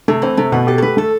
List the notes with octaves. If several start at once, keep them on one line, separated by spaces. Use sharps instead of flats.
C3 A3
E3 C4
C3 A3
B2 B3
G4 A4
A4
A3 B4
A3 A4